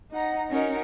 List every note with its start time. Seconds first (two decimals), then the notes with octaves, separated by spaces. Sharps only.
0.11 D#4 F#5 A#5
0.50 C#4 D#4 F#4 A#4